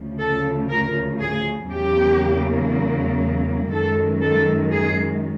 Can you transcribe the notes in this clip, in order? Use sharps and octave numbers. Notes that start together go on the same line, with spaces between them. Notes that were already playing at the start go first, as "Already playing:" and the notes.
Already playing: D2 C#3 F3
A4
A#4
G#4
E2 C#3 F#3 A#3 G4
F#2 D#3 G#3 A4
A4
G#4